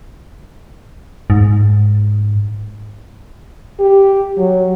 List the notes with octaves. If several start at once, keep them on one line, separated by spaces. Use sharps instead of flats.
G#2
G4
F#3